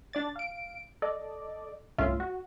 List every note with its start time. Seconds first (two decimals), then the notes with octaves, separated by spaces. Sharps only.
0.13 D4 D5 A6
0.36 F5 D7
1.02 A4 D5 D#5
1.98 G1 C2 A2 C#4 F4 E5
2.20 F#4